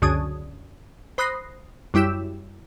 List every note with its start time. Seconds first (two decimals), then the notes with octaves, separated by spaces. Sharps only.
0.02 C#2 F#2 D3 D#6 G#6
1.18 C5 B5 D#6 F#6 A#6 C7
1.94 F#2 G3 E4 G4 E7